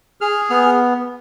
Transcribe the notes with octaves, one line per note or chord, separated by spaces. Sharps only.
G#4 F6
B3 F6